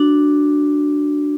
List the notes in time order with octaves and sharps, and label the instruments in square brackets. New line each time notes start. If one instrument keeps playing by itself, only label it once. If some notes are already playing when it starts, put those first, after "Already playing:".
Already playing: [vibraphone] D4 F#4